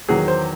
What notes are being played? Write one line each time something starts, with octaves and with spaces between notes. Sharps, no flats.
E2 D#3 F#3 G#4
C5